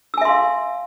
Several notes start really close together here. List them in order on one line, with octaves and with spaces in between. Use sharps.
E6 G#5 E5 C6 F5